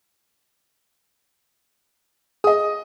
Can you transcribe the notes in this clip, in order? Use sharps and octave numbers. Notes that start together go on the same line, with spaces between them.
G#4 D#5 D#6